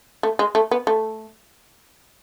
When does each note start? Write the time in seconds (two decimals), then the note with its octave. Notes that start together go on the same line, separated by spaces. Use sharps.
0.23 A3
0.39 G#3
0.55 A3
0.71 B3
0.87 A3